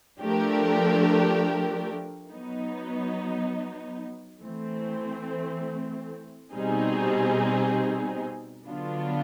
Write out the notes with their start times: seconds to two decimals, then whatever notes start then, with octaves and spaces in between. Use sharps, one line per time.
0.20 F3 A3 D4 G4 A#4
2.31 F#3 B3 D#4
4.42 E3 A3 C4
6.54 B2 G3 C4 D#4 G#4
8.66 D3 F#3 B3 D4 F4